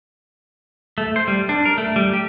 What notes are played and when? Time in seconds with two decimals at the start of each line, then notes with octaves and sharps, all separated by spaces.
0.98 A3
1.16 C5
1.28 G3
1.49 D4
1.65 A#4
1.78 A3
1.96 G3
2.13 G4